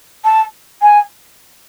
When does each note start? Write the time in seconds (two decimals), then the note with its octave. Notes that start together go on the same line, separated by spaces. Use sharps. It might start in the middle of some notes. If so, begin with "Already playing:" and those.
0.25 A5
0.82 G#5